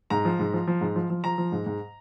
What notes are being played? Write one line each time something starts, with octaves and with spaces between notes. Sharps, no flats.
G#2 A#5
F3
G#2
F3
F3
G#2
F3
F3
F3 A#5
F3
G#2
G#2